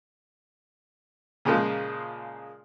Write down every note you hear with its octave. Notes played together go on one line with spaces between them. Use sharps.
A#2 C#3 F3 G#3 A#3